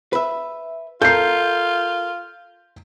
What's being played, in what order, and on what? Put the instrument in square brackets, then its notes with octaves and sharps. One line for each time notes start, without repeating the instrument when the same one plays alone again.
[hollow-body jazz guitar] B4 E5
[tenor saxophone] F4 [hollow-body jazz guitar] A4 A#4 [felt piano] G6 C7